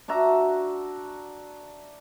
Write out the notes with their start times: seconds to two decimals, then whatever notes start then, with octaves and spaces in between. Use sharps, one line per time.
0.08 D4 F#4 E5 A#5